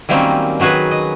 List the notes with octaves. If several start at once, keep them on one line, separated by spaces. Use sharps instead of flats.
D#3 F#3 G3 A#3 C4 C#4
D#3 F#3 F#4 G#4 B4
D#5